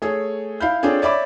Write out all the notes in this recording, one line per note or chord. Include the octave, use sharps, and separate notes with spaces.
A3 G#4 C#5
E4 F5 B5 G6
C4 D4 F4 G#4 A4 C#5
C#5 D5 E5 B5 D6